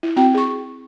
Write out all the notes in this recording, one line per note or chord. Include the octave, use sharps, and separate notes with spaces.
E4
C4 F#4 G5
G#4 C#6